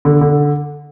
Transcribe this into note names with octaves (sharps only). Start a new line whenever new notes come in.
D3
D3